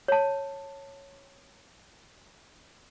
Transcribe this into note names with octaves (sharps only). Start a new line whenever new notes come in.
C#5 A5